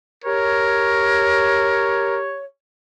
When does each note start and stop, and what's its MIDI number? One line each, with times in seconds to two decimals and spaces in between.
0.24 2.44 67
0.24 2.20 70
0.24 2.44 73